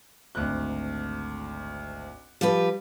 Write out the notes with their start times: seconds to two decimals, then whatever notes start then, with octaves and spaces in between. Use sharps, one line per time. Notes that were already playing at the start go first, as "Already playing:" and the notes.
0.35 G#1 D2 F#6
2.41 F3 G3 G4 B4